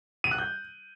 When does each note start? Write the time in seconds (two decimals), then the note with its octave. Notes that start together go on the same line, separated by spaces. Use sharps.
0.24 D#7
0.31 F#6
0.38 G6